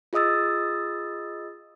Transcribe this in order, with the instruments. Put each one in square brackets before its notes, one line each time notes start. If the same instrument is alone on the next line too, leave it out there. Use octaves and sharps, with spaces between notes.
[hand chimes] F4 G#4 D#5 D#6 E6 A6